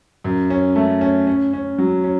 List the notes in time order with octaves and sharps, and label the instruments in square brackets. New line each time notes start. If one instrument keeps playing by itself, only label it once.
[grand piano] F#2
C#4
A3
C#4
C#4
C#4
F#3
C#4